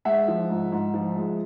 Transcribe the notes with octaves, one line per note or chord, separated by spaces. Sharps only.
G#3 E5 F#5
F3
G#2
G#2
F3
G#3